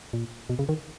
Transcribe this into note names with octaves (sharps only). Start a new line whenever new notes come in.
A#2
B2
C#3
D#3